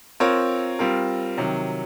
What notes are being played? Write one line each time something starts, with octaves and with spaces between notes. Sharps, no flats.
C4 F4 A#4 C#5
G3 C4 F4 A#4
C3 D#3 F#3